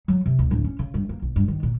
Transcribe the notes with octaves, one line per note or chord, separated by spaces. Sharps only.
F#3
C3
D2
D1
C#4
C#3
G2
A#3
B1
G2
D#3
A#2